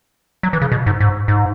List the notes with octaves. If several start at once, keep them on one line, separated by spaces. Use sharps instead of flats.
F#3
E3
C#3
B2
G#2
G#2
G#2